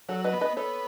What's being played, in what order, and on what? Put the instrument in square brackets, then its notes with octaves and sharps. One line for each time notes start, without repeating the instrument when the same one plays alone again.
[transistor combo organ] F#3 [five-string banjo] A4 C#5
[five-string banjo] B4 D#5
[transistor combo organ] B3
[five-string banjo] B4 D#5
[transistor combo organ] B3 [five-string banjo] A4 C#5